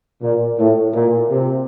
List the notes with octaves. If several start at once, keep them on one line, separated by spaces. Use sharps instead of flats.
A#2
A2
A#2
C3